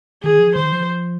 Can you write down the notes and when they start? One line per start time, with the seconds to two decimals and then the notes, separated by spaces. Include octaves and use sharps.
0.23 D#3 G#4
0.39 F3
0.56 D#3 C5
0.72 F3